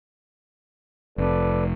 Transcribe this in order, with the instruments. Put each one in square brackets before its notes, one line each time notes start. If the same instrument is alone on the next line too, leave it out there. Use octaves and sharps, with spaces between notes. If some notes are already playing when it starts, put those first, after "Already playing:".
[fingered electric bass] F1 [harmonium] A4 B4 D5